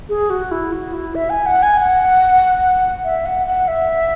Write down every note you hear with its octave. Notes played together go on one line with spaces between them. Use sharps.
G#4
F#4
E4
F#4
E4
E5
G#5
F#5
G#5
F#5
E5
F#5
F#5
E5